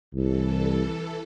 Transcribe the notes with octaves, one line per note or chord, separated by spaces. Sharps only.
C2 E3 A4